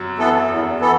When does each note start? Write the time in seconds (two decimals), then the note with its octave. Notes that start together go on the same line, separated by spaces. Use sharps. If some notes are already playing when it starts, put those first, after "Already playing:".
Already playing: F#2 F#3
0.18 E3 B3 A4
0.49 E2
0.80 E3 B3 A4